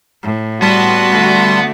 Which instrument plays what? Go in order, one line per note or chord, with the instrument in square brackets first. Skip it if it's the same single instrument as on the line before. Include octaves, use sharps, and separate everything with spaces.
[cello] A2
[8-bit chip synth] G3 A5 C6 [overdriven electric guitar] B3 [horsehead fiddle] F#4
[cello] D3 A3